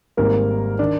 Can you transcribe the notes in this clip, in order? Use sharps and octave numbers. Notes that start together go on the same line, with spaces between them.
G#1 G#2 D#3 G3 A#3 A#4
D#3 D4 D5